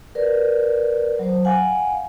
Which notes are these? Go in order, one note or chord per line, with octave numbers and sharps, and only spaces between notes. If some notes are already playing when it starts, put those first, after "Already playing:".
A#4 B4 D5
F#3 C5
F5 F#5 G#5